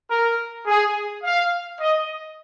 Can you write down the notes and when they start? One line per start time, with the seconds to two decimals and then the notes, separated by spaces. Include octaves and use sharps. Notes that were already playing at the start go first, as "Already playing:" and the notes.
0.10 A#4
0.67 G#4
1.23 F5
1.80 D#5